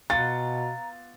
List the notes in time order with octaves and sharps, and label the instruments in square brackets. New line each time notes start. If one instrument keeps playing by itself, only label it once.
[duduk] B2 [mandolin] B3 F4 [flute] A#5 [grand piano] A6